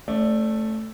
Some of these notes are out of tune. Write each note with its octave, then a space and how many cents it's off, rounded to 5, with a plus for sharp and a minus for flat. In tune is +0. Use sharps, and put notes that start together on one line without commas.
A3 +0 C#4 -30 D5 +10